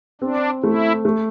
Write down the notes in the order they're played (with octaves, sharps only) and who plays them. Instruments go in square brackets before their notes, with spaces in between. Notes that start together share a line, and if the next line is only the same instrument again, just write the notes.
[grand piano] C4 [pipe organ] D4
[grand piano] A3 [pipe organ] E4
[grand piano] A3